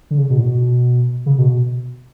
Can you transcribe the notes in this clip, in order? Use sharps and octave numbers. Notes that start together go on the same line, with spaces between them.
D3
C#3
B2
A2
B2
C#3
B2
B2